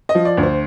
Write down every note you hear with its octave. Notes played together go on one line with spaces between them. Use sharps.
D#5
F3
D5
D2
C5